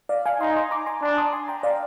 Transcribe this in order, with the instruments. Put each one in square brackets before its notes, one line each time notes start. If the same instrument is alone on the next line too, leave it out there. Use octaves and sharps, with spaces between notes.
[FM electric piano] D5 F5
F5 G#5
[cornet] D#4 [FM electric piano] G#5 C6
[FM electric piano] G#5 C6
A#5 D6
G#5 C6
[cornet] D4 [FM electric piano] A#5 D6
[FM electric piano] C6 D#6
G#5 C6
G5 A#5
D5 F5